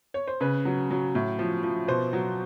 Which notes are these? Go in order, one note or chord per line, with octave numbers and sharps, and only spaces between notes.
C#5
C5
C#3 B4
F#3
F#3
A2
F3
F3
B2 C5
F#3